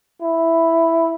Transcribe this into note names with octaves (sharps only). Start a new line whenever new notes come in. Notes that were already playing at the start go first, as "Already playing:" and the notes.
E4